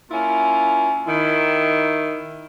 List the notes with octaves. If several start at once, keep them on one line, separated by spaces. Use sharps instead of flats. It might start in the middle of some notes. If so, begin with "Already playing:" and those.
A#3 C#4 E4 F4
D#3 E4